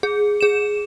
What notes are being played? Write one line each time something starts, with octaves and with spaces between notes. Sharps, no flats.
G#4
G#4 E7